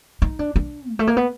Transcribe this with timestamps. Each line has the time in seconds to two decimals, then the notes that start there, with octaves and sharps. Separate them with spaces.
0.22 D#4
0.39 D4
0.56 D4
0.91 G#3
0.99 A3
1.07 A#3
1.17 B3